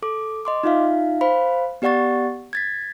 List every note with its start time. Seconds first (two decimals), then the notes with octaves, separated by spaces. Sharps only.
0.02 A4 D6
0.45 D#5 C6 D6
0.63 D#4 F4 E5 F5
1.21 C5 F5 B5
1.82 B3 G4 D5 F#5 C#6 A6
2.53 G#6 A6 B6